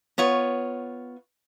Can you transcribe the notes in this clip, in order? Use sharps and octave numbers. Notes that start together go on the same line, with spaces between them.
B3 F4 C#5